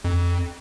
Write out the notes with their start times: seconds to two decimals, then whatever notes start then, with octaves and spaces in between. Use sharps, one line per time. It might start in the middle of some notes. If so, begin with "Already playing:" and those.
0.05 F2